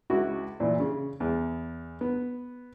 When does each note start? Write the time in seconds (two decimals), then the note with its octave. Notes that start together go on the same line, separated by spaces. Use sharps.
0.10 C#2 E4 F#4
0.60 A#2 E3
0.80 C#3
1.20 E2
2.01 B3